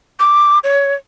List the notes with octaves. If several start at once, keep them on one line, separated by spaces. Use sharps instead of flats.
D6
C#5